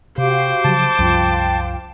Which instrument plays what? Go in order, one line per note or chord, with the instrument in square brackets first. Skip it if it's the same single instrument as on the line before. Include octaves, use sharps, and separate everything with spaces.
[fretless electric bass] C3 [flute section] F#4 G4 F5 [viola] C5 D6
[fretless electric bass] C#3 F3 F#3 [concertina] A5
[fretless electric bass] C2 F#2 F3 [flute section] F4 F5 G5